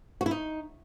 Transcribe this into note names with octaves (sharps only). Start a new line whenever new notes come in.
F#4
E4
D#4